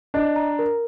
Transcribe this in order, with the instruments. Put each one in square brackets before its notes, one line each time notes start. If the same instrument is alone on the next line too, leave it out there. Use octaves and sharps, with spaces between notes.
[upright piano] D4 [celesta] D#5
[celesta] A#5
A#4